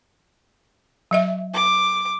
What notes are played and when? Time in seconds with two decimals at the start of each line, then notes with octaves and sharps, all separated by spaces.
1.11 F#3 D#5 E5
1.54 D6